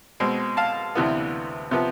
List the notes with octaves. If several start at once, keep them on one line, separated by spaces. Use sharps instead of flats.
B2 G#3 C4
F5 A5
D2 C3 E3 B3
C3 F3 B3